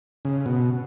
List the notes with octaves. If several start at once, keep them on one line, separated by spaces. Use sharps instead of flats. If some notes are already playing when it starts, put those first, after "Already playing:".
C#3
B2